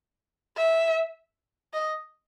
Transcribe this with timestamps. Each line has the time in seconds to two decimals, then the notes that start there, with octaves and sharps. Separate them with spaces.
0.57 E5
1.73 D#5